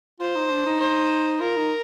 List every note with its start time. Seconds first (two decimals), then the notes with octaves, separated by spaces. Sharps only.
0.20 F4 C5
0.36 D#4
0.50 D4
0.66 D#4
0.80 C5
1.40 F4 A#4
1.57 D#4